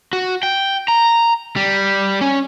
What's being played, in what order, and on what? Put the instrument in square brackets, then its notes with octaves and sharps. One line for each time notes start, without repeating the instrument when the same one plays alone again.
[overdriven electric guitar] F#4
G5
A#5
G3
C#4